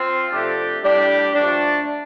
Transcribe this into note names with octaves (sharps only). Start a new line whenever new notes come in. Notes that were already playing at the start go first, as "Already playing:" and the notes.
Already playing: C4 F4
C3 F3 A3 D4 G4
A2 G3 D4 G4
G2 F3 A3 D4